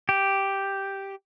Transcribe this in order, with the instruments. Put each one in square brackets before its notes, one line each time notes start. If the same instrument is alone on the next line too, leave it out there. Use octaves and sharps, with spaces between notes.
[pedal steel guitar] G4